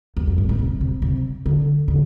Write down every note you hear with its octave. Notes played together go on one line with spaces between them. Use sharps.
E2
F2
G2
A2
C3
C3
C3
D3
D3